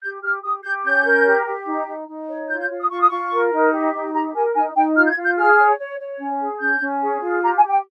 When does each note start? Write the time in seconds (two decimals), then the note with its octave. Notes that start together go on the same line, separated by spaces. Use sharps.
0.01 G4 G6
0.22 G4 F6
0.43 G4 D#6
0.63 G4 G6
0.84 C#4 G6
1.05 A#4
1.25 G4
1.46 G4
1.66 D#4
1.87 D#4
2.08 D#4
2.28 C#5
2.48 F4 G6
2.59 G6
2.69 F4
2.80 D#6
2.90 F4 C#6
2.99 D#6
3.08 F4 C#6
3.31 A#4
3.52 D#4
3.72 G4
3.93 D#4
4.13 G4 A#5
4.33 A#4 G#5
4.55 D#4 G#5
4.74 D#4 G5
4.95 F4 F6
5.05 G6
5.09 G#6
5.15 F4
5.23 G6
5.37 G#4 F6
5.57 C#5
5.78 C#5
5.99 C#5
6.19 C#4
6.40 G#4
6.60 C#4 G6
6.80 C#4
7.01 G#4
7.21 F4
7.42 G4 A#5
7.56 G#5
7.62 G4
7.69 G5